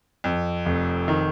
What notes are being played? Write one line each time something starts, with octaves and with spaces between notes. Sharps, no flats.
F2
F1
D#3